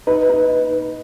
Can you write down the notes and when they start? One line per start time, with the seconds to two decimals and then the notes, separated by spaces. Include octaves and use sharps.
0.07 D#4 B4
0.30 D#4